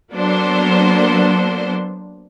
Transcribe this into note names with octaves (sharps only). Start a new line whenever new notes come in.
F#3 A#3 B3 D4 A4 C5